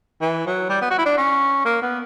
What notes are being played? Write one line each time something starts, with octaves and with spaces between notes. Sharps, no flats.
E3
F#3
G3
B3
F#4
E4
D4
C#4
A#3
B3